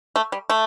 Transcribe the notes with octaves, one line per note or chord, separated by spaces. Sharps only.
A3
G3
A3